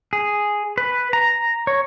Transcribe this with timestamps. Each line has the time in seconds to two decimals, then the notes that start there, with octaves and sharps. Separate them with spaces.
0.13 G#4
0.78 B4
1.13 A#5
1.67 C#5